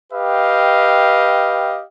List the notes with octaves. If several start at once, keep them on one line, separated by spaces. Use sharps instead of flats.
G4 B4 D#5 F5 G5